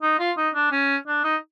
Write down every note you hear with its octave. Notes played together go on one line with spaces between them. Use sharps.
D#4
F4
D#4
D4
C#4
D4
D#4